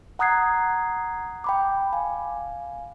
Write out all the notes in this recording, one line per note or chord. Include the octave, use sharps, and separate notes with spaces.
F#5 A#5 D#6 F#6 G#6 C7
G5 B5 D6
F5 G#5